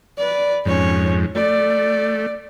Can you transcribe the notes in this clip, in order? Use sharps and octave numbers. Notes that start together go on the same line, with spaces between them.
B4 D5
F2 G#2 C#4 C#5
A3 D5